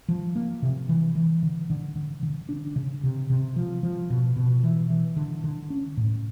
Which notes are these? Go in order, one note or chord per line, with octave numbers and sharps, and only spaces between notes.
F3
A#3
C3
E3
E3
D3
D3
D3
D3
D4
C#3
C3
C3
F3
F3
B2
B2
E3
E3
D3
D3
C#4
A2